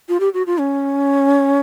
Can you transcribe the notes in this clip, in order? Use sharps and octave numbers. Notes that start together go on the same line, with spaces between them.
F4
G4
F#4
F4
C#4